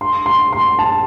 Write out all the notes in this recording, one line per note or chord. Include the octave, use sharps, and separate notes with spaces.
C6
C6
C6
A5